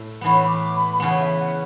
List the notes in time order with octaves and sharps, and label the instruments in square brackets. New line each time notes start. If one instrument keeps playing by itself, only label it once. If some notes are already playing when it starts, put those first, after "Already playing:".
Already playing: [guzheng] A2
[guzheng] A2 E3 B3 [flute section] B5
[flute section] D6
B5
[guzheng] C#3 E3 B3 [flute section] A5
[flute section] E5
F#5